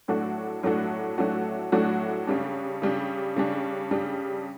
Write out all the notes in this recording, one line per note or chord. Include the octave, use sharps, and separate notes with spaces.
A2 F#3 A3 D4 F#4
A2 F#3 A3 D4 F#4
A2 F#3 A3 D4 F#4
A2 F#3 A3 D4 F#4
C#3 G3 D4
C#3 G3 D4
C#3 G3 D4
C#3 G3 D4